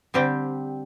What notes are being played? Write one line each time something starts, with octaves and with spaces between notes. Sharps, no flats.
D3 G3 C4 G4